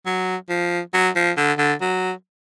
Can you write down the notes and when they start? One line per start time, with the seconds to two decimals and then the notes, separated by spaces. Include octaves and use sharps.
0.06 F#3
0.49 F3
0.94 F#3
1.16 F3
1.37 D3
1.58 D3
1.81 F#3